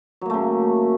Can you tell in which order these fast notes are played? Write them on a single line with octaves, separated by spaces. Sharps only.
F#3 A#3 A3 C#3